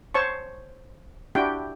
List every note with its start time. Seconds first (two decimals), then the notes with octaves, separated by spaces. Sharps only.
0.14 C5 C#5 A5 C#6
1.35 D4 E4 F#4 G4 G5